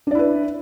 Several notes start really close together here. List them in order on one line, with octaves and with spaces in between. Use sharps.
D4 D5 E4 B4